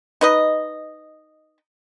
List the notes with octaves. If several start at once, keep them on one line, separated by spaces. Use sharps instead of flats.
D#4 B4 D#5